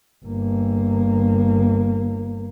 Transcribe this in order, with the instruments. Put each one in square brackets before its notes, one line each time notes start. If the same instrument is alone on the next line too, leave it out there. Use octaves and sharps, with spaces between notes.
[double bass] G1 A#3